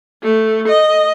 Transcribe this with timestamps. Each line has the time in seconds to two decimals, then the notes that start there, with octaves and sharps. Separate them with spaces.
0.23 A3
0.68 D#5